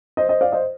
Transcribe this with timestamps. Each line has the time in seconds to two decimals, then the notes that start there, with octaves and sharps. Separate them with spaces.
0.17 C5 D#5
0.29 C5 D#5
0.41 D5 F5
0.52 C5 D#5